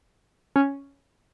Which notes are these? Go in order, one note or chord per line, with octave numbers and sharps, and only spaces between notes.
C#4